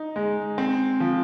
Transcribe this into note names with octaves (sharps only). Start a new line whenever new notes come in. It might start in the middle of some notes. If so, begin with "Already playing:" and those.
Already playing: D#4
G#3
C4
F3